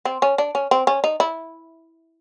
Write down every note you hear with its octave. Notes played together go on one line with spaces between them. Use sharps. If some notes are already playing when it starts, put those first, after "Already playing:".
C4
C#4
D4
C#4
C4
C#4
D#4
E4